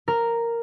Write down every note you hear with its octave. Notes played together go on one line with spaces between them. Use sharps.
A#4